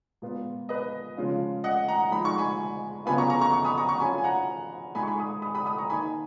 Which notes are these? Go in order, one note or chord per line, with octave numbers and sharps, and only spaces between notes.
A#2 G#3 B3 F4
B4 D#5
C#3 F3 G#3 C#4 F4
D#5 F#5
F#5 A#5
F3 G#3 D#4 B5
C#6
G#5 B5
C#3 F#3 B3 F4 G#5 B5
A#5 C#6
A#5 C#6
A#5 C#6
C#6
B5 D#6
A#5 C#6
A#5 C#6
F#3 C#4 F4 G#5 B5
G#5
F#5 A#5
A#2 G#3 D#4 G#5 B5
C#6
G#5 B5
B5 D#6
B5 D#6
B5 D#6
B5 D#6
A#5 C#6
D#3 A#3 D#4 G#5 B5